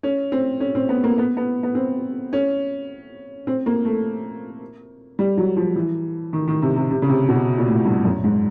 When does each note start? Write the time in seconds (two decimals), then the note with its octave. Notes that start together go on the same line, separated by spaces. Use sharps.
0.03 C#4
0.32 C4
0.60 C#4
0.75 C4
0.89 B3
1.04 A#3
1.18 B3
1.37 B3
1.63 B3
1.75 C4
2.33 C#4
3.47 C4
3.66 A#3
3.85 A3
5.19 G3
5.37 F#3
5.57 F3
5.76 E3
6.33 D#3
6.48 D#3
6.62 C3
6.76 C3
6.91 C3
7.02 C#3
7.09 C3
7.29 B2
7.58 A#2
7.67 A2
7.85 G2
8.05 F#2
8.24 G#2